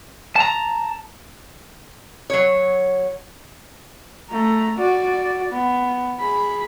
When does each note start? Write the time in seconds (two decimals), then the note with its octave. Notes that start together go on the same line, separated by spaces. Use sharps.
0.36 A5 A#5
2.30 F#3 C#5
4.30 A3 A#5
4.78 F#4 D5
5.52 B3
6.20 G#4 B5